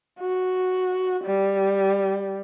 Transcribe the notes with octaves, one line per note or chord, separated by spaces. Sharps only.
F#4
G3